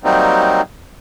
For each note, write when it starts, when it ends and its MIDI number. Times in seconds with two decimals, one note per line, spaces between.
0.04 0.61 54
0.04 0.61 55
0.04 0.61 58
0.04 0.61 60
0.04 0.61 63